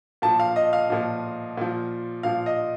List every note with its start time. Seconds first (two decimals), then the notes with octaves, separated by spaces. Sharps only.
0.22 A#2 F3 A5
0.39 F5
0.56 D#5
0.73 F5
0.90 A#2 F3
1.57 A#2 F3
2.23 A#2 F3 F5
2.46 D#5